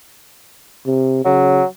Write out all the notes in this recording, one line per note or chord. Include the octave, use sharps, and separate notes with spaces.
C3
C#3 F#3